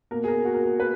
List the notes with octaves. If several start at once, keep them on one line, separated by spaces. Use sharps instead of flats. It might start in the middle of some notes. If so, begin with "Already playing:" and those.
B2 A#3 A#4
G#4
A#4
F#4
A#4
G#4
B4